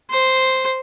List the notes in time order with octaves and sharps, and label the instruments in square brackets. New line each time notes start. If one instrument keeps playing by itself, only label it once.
[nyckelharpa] C5